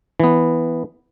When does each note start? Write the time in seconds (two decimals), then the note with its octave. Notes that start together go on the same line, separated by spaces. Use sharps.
0.20 E3 B3